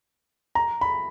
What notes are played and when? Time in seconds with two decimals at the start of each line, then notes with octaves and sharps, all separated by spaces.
0.55 A#5
0.81 B5